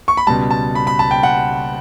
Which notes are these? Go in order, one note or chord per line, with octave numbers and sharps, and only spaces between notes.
C#6
B5
C#2 B2 G3 A5
A5
B5
B5
A5
G5
F#5